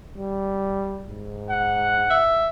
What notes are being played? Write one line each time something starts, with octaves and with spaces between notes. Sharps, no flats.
G3
G#2
F#5
E5